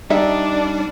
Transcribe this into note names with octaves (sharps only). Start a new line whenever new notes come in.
G3 D4 D#4 G4 E5